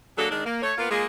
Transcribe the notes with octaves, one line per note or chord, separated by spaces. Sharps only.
F#3 A#3 D4 G#4 A4
D#3 G#3 D4
A#3
A3 C#5
A#3 B3 F4
G#3 A#3 F4 G#4